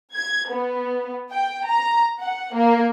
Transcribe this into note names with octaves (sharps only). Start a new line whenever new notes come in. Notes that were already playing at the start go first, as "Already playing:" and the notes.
G#6
B3
G5
A#5
F#5
A#3